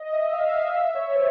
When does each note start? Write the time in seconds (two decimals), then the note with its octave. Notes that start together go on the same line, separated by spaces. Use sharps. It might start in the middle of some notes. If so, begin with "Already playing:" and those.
Already playing: D#5
0.13 E5
0.33 F5
0.47 E5
0.61 E5
0.68 D#5
0.74 E5
0.95 C#5
1.15 C5